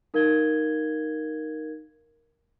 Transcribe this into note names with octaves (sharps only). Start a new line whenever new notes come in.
D#4 A#4 F5 G#6 G7